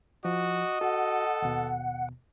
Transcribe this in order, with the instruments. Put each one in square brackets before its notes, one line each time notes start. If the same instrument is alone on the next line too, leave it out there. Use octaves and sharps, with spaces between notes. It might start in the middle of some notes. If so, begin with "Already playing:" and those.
[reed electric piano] F3 [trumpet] F#4 [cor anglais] D#5
[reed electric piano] F#4 [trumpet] A4 [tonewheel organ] F#5
[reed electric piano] D#2 B2